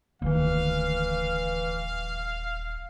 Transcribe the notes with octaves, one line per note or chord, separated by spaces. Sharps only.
D#1 D2 D#3 E3 F5